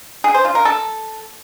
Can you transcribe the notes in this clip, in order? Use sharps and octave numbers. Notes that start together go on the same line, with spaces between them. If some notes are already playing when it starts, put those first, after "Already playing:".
G#4
C5
F4
A#4
A4